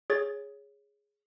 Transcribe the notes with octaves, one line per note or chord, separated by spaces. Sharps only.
G#4 C#5 A6